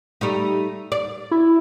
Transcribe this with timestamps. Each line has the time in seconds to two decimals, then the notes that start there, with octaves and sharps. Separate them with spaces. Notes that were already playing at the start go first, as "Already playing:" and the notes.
0.21 G3 A3 D#4
0.92 D5
1.31 E4